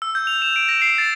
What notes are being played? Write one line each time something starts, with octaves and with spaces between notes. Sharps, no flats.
E6
G6
F7
E7
D7
A#6
C7
A6